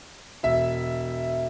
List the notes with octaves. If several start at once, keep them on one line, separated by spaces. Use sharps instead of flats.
E1 E5